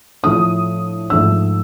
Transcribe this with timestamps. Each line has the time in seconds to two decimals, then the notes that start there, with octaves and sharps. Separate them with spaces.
0.23 A2 F3 A3 D4 D#6
1.10 G#2 F3 A3 D4 E6